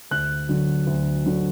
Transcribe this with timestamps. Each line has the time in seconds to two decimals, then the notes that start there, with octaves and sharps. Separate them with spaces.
0.11 D2 F#6
0.49 D3 F#3
0.87 D2
1.25 D3 F#3